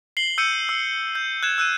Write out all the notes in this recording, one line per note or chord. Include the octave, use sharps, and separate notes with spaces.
C7 F#7 G7
E6 G6 C#7 D#7
E6
G6
F#6 G#6 E7
E6 F#6 D#7